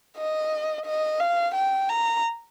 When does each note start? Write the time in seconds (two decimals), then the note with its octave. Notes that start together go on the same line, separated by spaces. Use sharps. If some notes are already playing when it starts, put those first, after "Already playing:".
0.17 D#5
0.86 D#5
1.20 F5
1.54 G5
1.89 A#5